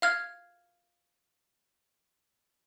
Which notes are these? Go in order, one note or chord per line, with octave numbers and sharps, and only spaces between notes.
F5 F6 G#6